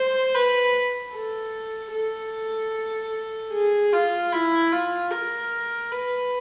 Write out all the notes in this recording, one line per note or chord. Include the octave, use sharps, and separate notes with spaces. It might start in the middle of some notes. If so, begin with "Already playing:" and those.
Already playing: C5
B4
A4
A4
G#4
F4
E4
F4
A#4
B4